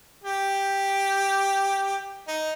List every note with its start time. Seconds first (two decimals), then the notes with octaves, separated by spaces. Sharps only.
0.24 G4
2.28 D#4